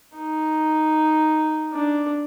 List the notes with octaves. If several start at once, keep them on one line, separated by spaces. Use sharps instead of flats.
D#4
D4